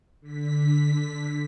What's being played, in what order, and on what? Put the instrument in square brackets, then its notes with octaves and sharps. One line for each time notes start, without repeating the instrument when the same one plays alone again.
[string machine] D3 B6